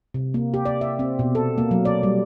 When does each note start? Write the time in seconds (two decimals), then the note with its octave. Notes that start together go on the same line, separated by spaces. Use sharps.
0.14 C3
0.34 A#3
0.54 G4
0.65 D5
0.81 E5
0.99 C4
1.19 B2
1.35 A4
1.58 A#3
1.71 F#3
1.85 D5
2.03 G3